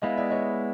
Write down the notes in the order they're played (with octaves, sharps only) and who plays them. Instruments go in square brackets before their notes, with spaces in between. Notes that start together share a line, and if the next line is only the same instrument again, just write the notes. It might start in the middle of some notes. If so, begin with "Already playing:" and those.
[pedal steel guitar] G#3 B3 E4 [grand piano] D#5 F5
[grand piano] D5 E5
C#5 D#5